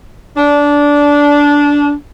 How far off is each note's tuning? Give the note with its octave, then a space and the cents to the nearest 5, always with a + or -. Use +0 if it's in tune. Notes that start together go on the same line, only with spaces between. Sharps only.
D4 -15